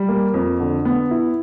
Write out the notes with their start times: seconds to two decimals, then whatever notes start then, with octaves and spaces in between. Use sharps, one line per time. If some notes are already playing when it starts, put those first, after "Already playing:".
Already playing: G3
0.09 A#3
0.34 F2
0.60 D3
0.85 B3
1.11 E4